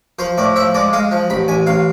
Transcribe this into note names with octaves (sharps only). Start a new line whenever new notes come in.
F3 C5
A2 D5
F3 E5
G#3 D5
G#3 F5
F3
A1 B5
A1 G#5
A1 F5